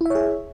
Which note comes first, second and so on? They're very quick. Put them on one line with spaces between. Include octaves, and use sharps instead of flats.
E4 E5 C#5 G#4